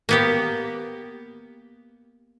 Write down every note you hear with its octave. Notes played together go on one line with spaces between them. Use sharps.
A#3 B3 G4